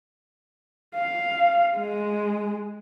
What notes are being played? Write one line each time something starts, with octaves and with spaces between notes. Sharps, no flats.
F5
G#3